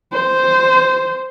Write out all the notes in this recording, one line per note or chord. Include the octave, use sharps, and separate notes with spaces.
C5